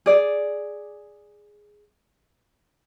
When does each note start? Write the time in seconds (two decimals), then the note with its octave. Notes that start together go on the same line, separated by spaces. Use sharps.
0.06 G#4 D5